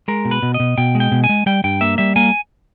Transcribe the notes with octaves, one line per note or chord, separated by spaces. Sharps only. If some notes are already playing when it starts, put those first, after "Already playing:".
G#3 A#4
B2
B4
B2
D#5
B2
B2 G5
G#3
G5
B2
G#5
G#3
G3 G5
G2 G5
A#3 E5
G3 E5
A#3 G#5